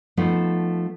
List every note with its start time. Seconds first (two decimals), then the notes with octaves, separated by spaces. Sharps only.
0.17 F3 A3 B3 D#4